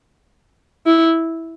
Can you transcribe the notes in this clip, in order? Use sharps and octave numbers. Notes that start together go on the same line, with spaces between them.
E4